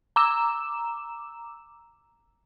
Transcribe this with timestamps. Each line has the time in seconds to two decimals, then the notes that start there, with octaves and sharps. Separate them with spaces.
0.16 A#5 D6 E6 E7